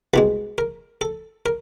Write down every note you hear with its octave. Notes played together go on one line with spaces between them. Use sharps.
C2 B2 G#3 B4
A#4
A4
A#4